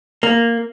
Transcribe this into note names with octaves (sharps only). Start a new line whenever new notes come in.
A#3